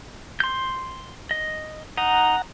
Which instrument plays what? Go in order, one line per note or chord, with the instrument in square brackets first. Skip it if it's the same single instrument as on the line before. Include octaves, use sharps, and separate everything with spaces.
[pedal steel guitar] C6 G6
D#5
[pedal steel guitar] D#4 [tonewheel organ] F#5 A#5